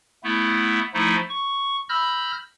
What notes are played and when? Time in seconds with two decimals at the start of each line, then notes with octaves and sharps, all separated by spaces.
0.24 A3 B3 E4
0.94 F3 A3 D#4 E4
1.29 C#6
1.89 B5 E6 F6 G6 A#6